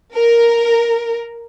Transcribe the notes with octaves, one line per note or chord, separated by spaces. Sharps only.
A#4